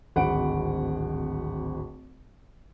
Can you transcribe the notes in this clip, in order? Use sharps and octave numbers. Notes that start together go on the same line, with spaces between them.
D1 G#1 F#5 B5 D7